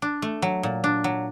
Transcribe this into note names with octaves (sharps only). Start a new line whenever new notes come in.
D4
A3
F#3
A#2
D4
F#3